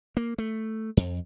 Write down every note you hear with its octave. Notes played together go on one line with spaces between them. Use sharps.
A#3
A3
F2